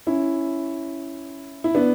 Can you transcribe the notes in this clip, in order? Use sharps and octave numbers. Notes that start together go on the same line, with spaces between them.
C#4 E4
E4
B3 D4